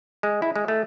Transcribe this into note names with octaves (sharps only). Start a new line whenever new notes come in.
G#3
E4
G#3
A3